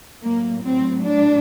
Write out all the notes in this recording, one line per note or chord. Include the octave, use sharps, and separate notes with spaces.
A2 F#3 A#3
C4
D4